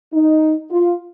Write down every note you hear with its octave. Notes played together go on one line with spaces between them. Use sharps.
D#4
F4